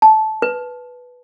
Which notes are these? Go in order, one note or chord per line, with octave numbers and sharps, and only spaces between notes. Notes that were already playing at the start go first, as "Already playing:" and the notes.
A5
B4